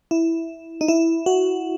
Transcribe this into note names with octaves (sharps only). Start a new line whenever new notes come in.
E4
D#4
E4
F#4